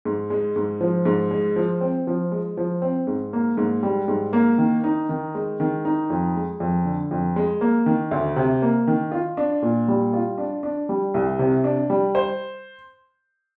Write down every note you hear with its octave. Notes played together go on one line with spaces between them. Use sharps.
G#2
G#3
G#2
F3
G#2
G#3
F3
C4
F3
G#3
F3
C4
G#2
A#3
G#2
G3
G#2
A#3
D#3
D#4
D#3
G#3
D#3
D#4
F2
G#3
F2
D3
F2
G#3
A#3
D#3
D2
C3
A#3
D#3
F4
D4
A#2
G3
F4
D4
D4
G3
C2
C3
D4
G3
C5